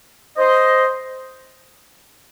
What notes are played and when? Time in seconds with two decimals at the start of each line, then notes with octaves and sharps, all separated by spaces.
0.38 C5 D#5